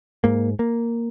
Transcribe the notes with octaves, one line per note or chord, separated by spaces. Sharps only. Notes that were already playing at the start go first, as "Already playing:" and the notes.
G#2 A#3
A#3